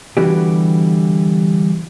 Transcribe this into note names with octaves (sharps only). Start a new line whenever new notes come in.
D3 E3 G3 B3 F#4 G4